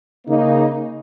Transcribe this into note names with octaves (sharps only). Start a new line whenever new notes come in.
C#3 A#3 D#4